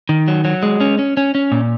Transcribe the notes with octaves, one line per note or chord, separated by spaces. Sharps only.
D#3
F#3
F#3
G#3
C#4
C#4
C#4
C#4
A#2